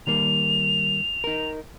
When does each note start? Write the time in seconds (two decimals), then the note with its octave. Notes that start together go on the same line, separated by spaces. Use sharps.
0.07 D#3 G3 A#3 F7
1.24 D#4 A#4